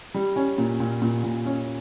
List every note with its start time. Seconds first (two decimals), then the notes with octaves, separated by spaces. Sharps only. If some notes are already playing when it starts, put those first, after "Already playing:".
0.14 G3
0.36 C#4
0.58 A#2
0.80 A#2
1.02 A#2
1.24 A#2
1.45 C#4